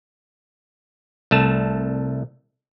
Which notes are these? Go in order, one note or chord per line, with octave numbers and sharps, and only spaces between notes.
C2 A3 A5